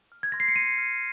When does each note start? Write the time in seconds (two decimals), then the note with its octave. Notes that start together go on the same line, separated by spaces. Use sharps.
0.12 F6
0.23 G#6
0.32 C6 A#6
0.40 C7
0.48 C#7
0.56 C6 D#7
0.78 F6